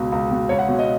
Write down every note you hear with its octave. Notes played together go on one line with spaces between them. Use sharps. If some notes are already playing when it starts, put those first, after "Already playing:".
Already playing: C#2 B2
C#2
B2
C#2 C#5
F#5
B2
D#5